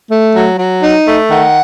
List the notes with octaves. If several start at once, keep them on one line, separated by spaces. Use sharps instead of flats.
A3
F#3
F#3
D#4
A3
D#3 F#5